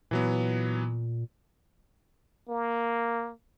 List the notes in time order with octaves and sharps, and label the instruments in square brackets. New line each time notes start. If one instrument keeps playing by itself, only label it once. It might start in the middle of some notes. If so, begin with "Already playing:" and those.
[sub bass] A#2 [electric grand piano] E3 F#3 B3
[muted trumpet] A#3